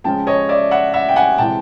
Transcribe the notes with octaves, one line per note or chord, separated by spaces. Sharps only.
C#3 F3 G#3 C#4 G5 A5
C#5 D#5
D5 E5
E5 F#5
E5 F#5
G5
F#5 G#5
C3 E3 G#3 G5 A5